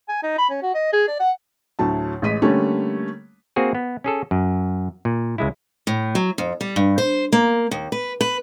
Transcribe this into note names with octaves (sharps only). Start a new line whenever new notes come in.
G#5
D#4
B5
C#4
F#4
D#5
G#4
D5
F#5
D2 A2 F#3 A5
A1 G#3 B6 D#7
D3 G3 A3 A#3 C#4
A#3 C4 F#4 G#4
B3
C#4 G#4 A4
F#2
A#2
C#2 G#3 E4
A2
F#3
F2
G3
G2
C5
A#3
D#2
B4
B4